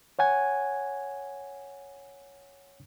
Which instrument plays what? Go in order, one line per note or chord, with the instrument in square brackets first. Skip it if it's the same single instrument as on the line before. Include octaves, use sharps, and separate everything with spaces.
[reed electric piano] C#5 F#5 G#5 G#6